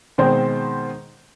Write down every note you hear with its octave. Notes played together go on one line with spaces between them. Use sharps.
B2 D#3 G#3 C4 C5